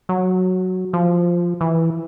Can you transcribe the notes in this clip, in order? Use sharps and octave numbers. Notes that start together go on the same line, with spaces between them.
F#3
F3
E3